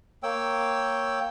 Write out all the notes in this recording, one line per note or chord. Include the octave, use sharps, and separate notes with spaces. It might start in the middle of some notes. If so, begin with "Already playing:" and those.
A#3 C#5 G5 E6